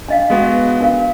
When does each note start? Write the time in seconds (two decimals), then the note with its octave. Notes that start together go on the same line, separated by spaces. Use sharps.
0.08 D4 D#5 F5
0.30 G#3 B3 F#4
0.80 D4 A#4 F5